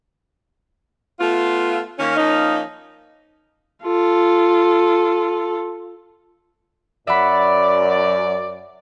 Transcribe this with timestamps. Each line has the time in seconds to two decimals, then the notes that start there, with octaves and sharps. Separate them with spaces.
1.20 A3 B3 F4
1.99 D#3 A#3 C#4
2.17 F3 A#3 C#4 D#4
3.83 F4 A4
7.07 F#2 D5 E5 F#5 B5